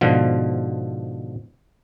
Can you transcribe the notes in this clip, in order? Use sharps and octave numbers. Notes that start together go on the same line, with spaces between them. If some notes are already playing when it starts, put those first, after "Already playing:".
G#2 B2 D3 F3